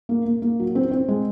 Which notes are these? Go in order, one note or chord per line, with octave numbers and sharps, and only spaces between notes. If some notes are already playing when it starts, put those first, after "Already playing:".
A#3
A#3
A#3
F#3
C4
C4
G#3